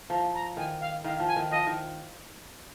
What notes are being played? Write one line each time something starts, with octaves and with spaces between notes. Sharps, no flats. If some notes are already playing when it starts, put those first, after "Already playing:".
F3 A#5
A#5
D#3 G#5
F5
D#3 F5
F3
G#5
D#3
F3 D#5
D#3